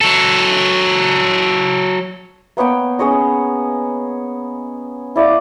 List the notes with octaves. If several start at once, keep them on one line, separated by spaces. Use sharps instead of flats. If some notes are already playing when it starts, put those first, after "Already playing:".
F#3 A4
A#3 B3 C#5 G5
C#4 G#4 C#5 D#5
E4 D5 F5 D6